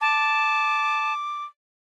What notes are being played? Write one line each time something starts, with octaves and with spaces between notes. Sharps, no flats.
A5 D6